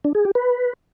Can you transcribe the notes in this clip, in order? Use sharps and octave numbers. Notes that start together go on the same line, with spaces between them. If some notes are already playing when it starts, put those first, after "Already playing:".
D4
G#4
G4
B4